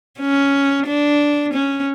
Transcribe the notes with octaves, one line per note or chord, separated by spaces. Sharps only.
C#4
D4
C#4